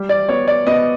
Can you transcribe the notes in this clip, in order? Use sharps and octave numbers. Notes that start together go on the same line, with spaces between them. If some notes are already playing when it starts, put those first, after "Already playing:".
Already playing: G3
D5
B3 C#5
D5
B3 D#5